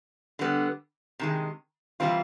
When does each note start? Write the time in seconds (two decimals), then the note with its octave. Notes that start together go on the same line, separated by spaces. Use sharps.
0.39 D3 G3 B3
1.19 C3 D#3 G#3
2.00 C3 E3 G3 C4 F4